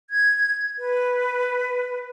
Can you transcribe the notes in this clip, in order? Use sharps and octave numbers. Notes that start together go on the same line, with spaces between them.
G#6
B4